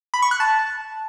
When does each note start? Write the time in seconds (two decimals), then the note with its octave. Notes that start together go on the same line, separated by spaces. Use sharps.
0.14 B5
0.22 C#6
0.31 F#6
0.40 A5